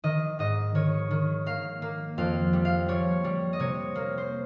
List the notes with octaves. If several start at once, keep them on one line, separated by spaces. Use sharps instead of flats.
D#3 D#5
G#2 D#5
D#3 C#5
D#3
A#3 F5
A#3
F2 F5
G3
F5
G3 C#5
G3
D#5
C3 C#5
A#3
C5